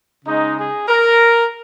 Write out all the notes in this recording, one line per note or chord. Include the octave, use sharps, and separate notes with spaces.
C#3 G#3 D#4
G#4
A#4